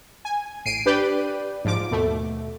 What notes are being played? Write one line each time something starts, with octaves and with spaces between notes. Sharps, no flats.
G#5
A1 C7 D7 D#7
D4 G4 B4 D5 G5
G#2 F3 D6
D#2 B2 A3